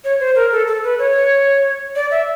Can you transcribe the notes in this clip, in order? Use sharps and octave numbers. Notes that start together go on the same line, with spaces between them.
C#5
C5
A#4
A4
A4
B4
C#5
D5
E5